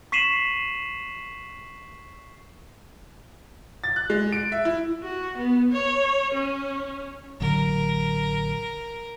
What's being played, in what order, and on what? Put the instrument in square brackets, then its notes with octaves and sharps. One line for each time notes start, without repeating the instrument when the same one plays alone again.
[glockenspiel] C#6 B6 C7 D#7 E7 F#7
[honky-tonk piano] A6
F#6
G#3
D7
E5
E4
[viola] F#4
B3
C#5
C#4
[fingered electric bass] A1 D3 F#3 [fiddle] A#4